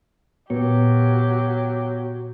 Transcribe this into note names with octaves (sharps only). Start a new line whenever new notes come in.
A#2 F#3 B3 G4